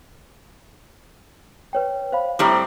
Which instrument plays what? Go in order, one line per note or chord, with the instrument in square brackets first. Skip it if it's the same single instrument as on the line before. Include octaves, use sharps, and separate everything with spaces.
[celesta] B4 C#5 G5
C5 F5 B5
[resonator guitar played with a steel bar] A2 G3 C4 [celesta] C5 A#5 B5